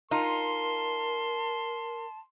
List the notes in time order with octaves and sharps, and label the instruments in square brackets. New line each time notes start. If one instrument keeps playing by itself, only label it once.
[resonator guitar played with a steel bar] D#4 F4 [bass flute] A#4 [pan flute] A5 [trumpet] C6